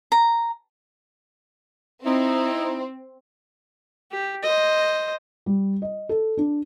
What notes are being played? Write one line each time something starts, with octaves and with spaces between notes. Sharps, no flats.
A#5
C4 D#4 E4
G4
C5 D#5
G3
D#5
A4
D4